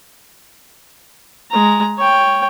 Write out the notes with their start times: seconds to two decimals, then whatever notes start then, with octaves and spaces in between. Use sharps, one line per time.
1.51 G#3 A#5
1.97 C#5 G5